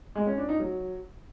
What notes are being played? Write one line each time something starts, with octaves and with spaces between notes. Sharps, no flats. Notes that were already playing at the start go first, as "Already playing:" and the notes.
G#3
C#4
D4
D#4
F#3